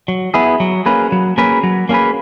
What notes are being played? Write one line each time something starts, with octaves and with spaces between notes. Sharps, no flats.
F#3
B3 E4 G#4
F#3
A#3 C#4 G#4 B4
F#3
A#3 C#4 G#4 B4
F#3
A#3 C#4 G#4 B4